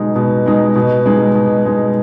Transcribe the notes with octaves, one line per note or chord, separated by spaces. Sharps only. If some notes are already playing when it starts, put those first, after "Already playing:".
Already playing: B2 G#3 D#4
B2
G#3 D#4
B2
G#3 D#4
B2
G#3 D#4